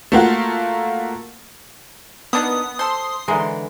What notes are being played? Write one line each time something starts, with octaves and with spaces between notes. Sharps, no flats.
A3 A#3 F4 F#4
A#3 B3 D4 D#4 D#6
A4 C5 C6
D3 E3 G#3 G#4 A#4